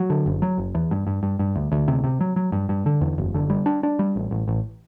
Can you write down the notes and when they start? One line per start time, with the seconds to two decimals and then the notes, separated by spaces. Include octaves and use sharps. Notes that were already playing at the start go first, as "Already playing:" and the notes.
Already playing: F#3
0.10 D3
0.26 F#1
0.42 F#3
0.58 F#1
0.75 E2
0.91 G2
1.07 G2
1.23 G2
1.39 G2
1.56 D2
1.72 D2
1.88 C3
2.04 C3
2.21 F#3
2.36 F#3
2.52 G2
2.69 G2
2.86 D3
3.01 E2
3.18 F#1
3.34 D3
3.50 G3
3.66 D4
3.83 D4
3.99 G3
4.16 A1
4.31 A1
4.48 A1